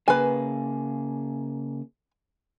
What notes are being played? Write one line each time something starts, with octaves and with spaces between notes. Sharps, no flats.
C#3 A#3 G#4 B4 G#5